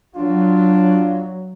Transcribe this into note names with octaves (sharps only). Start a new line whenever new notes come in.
F#3 D4 F4